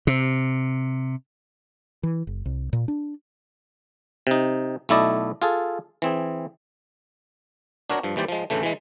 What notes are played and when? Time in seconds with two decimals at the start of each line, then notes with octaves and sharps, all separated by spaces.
0.07 C3
2.03 E3
2.27 F#1
2.46 C2
2.73 A#2
2.88 D4
4.27 C3 D#4
4.89 B1 A3 E4 D5 D#5
5.42 F4 G#4 A4
6.02 E3 C4 G#4
7.90 D4 F#4 A#4 C#5
8.03 G2 F3
8.16 D#2 E3 G3 C5 D5
8.28 F3 G#3
8.50 D2 A2 C#3 E3 A3
8.63 E3 G#3